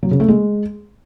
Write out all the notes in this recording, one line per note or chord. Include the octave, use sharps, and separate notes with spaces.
F#3
C#3
A3
G#3